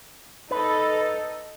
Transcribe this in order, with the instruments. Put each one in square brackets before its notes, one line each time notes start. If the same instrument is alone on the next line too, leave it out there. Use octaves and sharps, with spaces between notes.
[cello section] D#4 A4 [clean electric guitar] B4